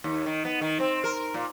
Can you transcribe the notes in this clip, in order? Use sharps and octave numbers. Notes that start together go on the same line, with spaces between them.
D#2
D#3
B3
D#3
C4
A#4
A#2